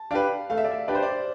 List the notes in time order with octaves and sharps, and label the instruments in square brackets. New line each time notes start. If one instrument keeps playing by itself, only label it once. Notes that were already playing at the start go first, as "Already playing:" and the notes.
Already playing: [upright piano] A5
[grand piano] D4 G4 B4 [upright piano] F5
[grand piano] A3 [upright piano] F5
[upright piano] E5
D5
E5
[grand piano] D4 G4 B4 [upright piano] D5
[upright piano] C5
D5